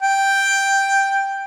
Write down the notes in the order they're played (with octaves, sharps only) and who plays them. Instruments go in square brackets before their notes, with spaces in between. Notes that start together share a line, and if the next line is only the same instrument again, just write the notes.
[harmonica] G5